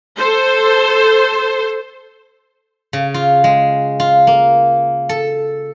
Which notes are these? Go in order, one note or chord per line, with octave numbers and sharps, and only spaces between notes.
A4 C5
C#3
F4
G#3
F4
A#3
A4